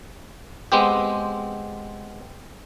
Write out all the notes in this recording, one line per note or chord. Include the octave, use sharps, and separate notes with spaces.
G#3 B3 C4 G4